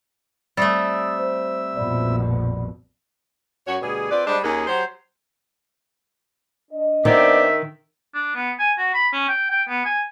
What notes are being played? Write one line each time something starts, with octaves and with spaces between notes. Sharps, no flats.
G3 A3 C4 E5 D#6 E6 A6
C5
A#1 F2 B2 D5 B5
F#2 F#4 C#5
D2 B2 G3 G#4
C4 F4 B4 D5
G3 G#3 D4 C5 D#5
D#2 A#3 C#4 G#4
F#3 G4 C5
D4 D#5
D#3 B3 C4 D5 E5
D4
B3
G#5
F#4
B5
C#4
G5
G5
B3
G#5